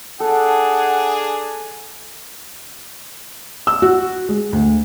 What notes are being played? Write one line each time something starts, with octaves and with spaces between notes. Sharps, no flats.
D4 G#4 A4 F#5
E6
F#4
G#3
D2